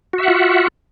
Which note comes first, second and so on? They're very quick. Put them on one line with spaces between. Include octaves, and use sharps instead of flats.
F#4 E5 F#5 F4